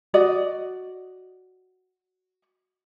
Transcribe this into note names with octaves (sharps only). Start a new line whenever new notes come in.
F#4 D5 D#5